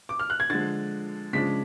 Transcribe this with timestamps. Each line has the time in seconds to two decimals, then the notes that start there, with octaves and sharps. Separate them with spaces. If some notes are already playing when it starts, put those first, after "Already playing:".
0.09 D6
0.20 F6
0.30 F#6
0.40 G#6
0.50 D3 F3 G#3 A6
1.33 C#3 F3 G#3 D4 B6